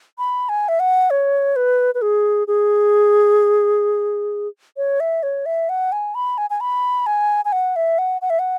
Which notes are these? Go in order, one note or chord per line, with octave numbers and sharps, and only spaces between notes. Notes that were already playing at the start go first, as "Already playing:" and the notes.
B5
G#5
E5
F#5
C#5
B4
B4
G#4
G#4
C#5
E5
C#5
E5
F#5
G#5
B5
G#5
G#5
B5
G#5
G#5
F#5
E5
F#5
F#5
E5
F#5